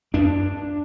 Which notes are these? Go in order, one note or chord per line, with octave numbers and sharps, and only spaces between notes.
F#2 D4